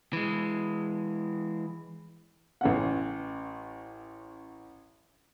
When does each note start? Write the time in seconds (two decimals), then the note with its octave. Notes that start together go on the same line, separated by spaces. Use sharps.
0.13 E3 G#3
2.61 A1 C#4 F#5